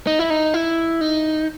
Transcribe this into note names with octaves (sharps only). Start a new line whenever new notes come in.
D#4
E4
D#4
E4
D#4